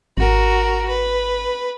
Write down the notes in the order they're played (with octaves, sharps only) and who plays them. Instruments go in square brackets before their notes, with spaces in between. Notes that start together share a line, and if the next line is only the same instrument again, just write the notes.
[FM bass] G#1 [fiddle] F#4 A#4
[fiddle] B4